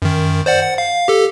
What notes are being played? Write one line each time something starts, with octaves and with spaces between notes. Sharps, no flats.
F#2 D#3
C5 D5 F#5
F#5
F5
G4 A4